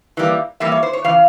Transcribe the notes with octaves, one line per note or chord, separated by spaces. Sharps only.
E3 G3 A#3
E3 G3 A#3 E5
C#5
C5
C#5
C#3 E3 F5